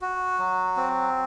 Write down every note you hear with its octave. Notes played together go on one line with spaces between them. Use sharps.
F#4
F#3
C4